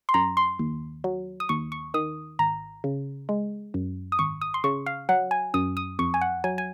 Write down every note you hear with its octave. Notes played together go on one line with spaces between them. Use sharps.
C6
F#2 A#5
C6
D#2
F#3
D#6
D#2 C#6
C#6
D#3 D#6
G#1 A#5
C#3
G#3
F#2
D#6
G#1 C#6
D#6
C6
C#3 C#6
F5
F#3 F#5
G#5
F#2 D#6
D#6
F2 C#6
G#5
F#5
F#3 G#5
G#5